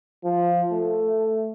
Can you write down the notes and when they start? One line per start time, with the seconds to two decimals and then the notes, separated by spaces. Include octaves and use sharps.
0.24 F3
0.72 A3